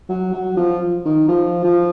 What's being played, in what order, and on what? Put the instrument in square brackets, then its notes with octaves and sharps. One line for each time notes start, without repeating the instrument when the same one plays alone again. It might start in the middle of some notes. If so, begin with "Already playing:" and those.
[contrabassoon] F#3
F#3
F3
D#3
F3
F3